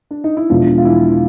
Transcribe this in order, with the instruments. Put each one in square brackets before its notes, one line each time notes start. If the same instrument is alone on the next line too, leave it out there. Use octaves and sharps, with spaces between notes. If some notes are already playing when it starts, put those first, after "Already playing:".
[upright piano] D4
D#4
E4
[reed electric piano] E2 B2 G#3 B3 D4 [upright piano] F3 F4
[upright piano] F4
E3 E4